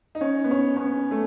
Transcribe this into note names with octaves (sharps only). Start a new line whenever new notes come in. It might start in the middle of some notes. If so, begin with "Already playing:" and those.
D#4
C#4
B3
C#4
C#4
B3
A3